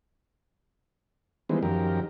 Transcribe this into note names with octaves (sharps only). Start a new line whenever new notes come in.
D#3 E3 G3 G#3 B3 C4
F#2 D#3 F3 G4 A#4